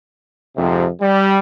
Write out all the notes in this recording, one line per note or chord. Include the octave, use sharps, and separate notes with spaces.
F2 G#2 C3
G3